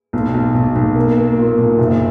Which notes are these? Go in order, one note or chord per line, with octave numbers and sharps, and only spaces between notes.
B1
B1
B1
B1
A#3
A#3
A#2
B1
F#1